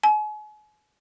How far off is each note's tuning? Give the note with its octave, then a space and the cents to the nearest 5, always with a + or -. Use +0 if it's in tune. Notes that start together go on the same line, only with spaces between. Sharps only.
G#5 +40